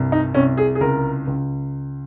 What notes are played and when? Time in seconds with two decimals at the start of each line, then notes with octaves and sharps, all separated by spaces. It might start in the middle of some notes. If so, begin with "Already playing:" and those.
Already playing: C2 G2
0.12 D#4
0.35 C2 C#4
0.57 G#4
0.75 G#4
0.81 C#2 A#4
1.27 C#2